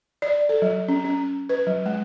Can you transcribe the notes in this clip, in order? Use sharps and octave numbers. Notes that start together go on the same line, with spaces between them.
D5
A4
F#3
C#4
C#4
B4
F#3
G#3